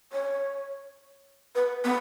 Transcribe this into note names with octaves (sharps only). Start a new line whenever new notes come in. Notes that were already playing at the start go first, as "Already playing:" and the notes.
C#5
B4
B3